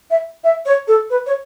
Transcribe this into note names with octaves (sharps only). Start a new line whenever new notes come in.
E5
E5
C#5
A4
B4
C#5